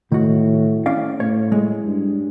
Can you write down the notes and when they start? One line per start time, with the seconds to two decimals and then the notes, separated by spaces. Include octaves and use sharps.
0.12 A2 D#3 F#4
0.86 C#4 D5 F5
1.20 A2 C#5
1.52 G#3
1.86 G2